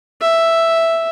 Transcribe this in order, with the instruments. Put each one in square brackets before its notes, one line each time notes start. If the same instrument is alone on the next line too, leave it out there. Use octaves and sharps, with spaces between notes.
[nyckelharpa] E5